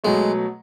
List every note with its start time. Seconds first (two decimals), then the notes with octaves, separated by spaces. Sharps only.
0.04 B2 F#3 G#3 A3